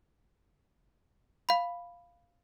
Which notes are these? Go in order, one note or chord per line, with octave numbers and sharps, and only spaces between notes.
F5 B5